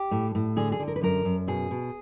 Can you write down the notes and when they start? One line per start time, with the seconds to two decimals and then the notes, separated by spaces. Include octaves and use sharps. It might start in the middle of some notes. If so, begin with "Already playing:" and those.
Already playing: G4
0.11 A2
0.35 A2
0.56 D3 G#4
0.72 G#4
0.79 D3
0.88 A#4
0.96 B4
1.02 F#2 A#4
1.25 F#2
1.47 B2 G#4
1.71 B2